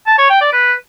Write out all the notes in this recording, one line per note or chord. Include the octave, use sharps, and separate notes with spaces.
A5
C#5
G5
D5
B4